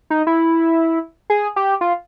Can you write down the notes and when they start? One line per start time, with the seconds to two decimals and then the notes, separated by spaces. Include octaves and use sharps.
0.10 D#4
0.27 E4
1.30 G#4
1.56 G4
1.81 F4